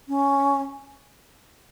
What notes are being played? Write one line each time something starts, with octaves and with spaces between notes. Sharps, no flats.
C#4